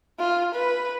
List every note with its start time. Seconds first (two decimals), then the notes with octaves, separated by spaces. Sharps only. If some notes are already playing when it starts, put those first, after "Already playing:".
0.20 F4
0.55 B4